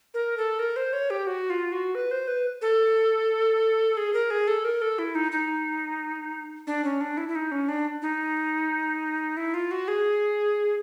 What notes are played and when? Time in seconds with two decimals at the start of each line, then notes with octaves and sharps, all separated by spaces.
0.14 A#4
0.37 A4
0.59 A#4
0.76 C5
0.93 C#5
1.10 G4
1.27 F#4
1.50 F4
1.72 F#4
1.95 B4
2.11 C5
2.28 B4
2.62 A4
3.97 G#4
4.13 A#4
4.30 G#4
4.48 A4
4.64 A#4
4.82 A4
4.99 E4
5.15 D#4
5.32 D#4
6.67 D4
6.84 C#4
7.01 D4
7.17 E4
7.29 E4
7.35 D#4
7.52 C#4
7.69 D4
8.02 D#4
9.37 E4
9.54 F4
9.71 F#4
9.88 G#4